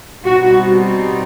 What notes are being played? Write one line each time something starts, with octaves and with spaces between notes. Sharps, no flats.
B2 G3 C4 D#4 F#4